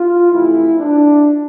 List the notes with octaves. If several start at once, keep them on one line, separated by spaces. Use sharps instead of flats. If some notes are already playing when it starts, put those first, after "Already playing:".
Already playing: F4
F2 C3 E3 A3 E4
D4